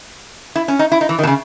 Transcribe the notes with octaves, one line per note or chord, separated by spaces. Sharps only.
E4
C#4
D#4
E4
D#4
E3
D#3
B2
C#3